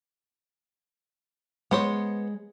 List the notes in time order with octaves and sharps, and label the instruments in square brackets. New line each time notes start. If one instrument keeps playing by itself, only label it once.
[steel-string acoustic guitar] G#3 [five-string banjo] B3 C5 C#5